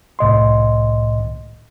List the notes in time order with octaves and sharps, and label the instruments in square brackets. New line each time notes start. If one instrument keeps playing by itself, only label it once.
[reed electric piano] C2 A2 D#5 C6